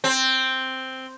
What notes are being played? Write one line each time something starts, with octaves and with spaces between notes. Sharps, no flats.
C4